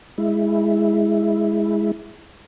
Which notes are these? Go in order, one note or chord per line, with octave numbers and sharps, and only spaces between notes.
G#3 E4